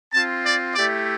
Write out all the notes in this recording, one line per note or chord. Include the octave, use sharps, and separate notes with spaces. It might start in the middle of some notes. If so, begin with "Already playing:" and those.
C4 F4 A5
D5
A3 E4 G4 D5